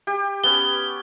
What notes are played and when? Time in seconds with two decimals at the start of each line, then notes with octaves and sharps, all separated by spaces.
0.07 G4
0.44 B3 C#4 G7